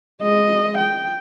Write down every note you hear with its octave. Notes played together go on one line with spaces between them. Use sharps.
G#3 D#5
G5